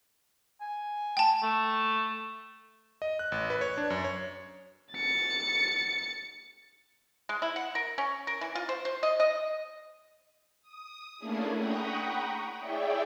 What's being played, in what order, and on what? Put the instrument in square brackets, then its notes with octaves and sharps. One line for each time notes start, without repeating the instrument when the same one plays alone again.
[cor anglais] G#5
[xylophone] G5 A5
[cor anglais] A3
[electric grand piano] D#5
F#6
A1
B4
C#5
D4
F#2
C#5
[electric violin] A6 C#7
[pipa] G#3
E4
F#5
A#4
C#4
A#4
E3
F4
C5
C5
D#5
D#5
[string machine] D#6
A3 A#3 C#4 D4 E4 G#4
F#5 G5 A#5 B5 C#6 D#6
E4 G#4 C#5 D5 E5 G5